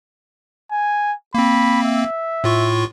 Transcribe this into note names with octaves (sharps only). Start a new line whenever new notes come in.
G#5
A#3 C4 B5
E5
A2 F4 C#6